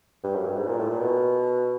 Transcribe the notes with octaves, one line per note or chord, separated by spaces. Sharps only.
G2
F#2
G2
G#2
A#2
A2
A#2
B2